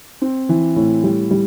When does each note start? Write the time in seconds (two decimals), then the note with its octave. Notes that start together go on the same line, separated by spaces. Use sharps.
0.22 C4
0.49 E3
0.76 A2
1.04 G3
1.31 G3